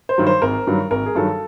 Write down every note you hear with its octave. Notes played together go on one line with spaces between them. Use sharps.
C5
G2 D#3 F#3
C5
G#1 A#4
G2 D#3 F#3
G#1 A#4
G#4
G2 D#3 F#3 A4